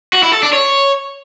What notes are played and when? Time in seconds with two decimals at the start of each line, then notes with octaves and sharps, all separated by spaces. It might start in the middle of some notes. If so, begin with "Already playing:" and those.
0.13 F#4
0.23 E4
0.33 A4
0.43 D4
0.53 C#5